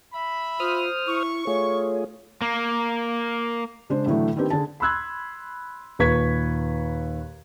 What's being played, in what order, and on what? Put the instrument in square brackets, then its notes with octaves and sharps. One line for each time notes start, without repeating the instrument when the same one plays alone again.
[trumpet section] E5 B5
[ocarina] F4 [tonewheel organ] C5 D#6 F6
[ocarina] E4 [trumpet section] C#6
[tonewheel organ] A3 F4 G#4 [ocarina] C#5
[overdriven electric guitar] A#3
[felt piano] C#3 G#3 D4 C5
A2 D3 E3 F#3 A3
D#3 A#3 C4 D4 G4 B4
D3 G#4 A5
[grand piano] B5 C6 E6 F#6 G#6
D#2 A#2 B4 C#6 G#6 B6